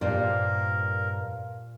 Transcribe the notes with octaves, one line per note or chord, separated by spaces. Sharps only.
G2 A#2 A#3 F4 A#4 C5 D5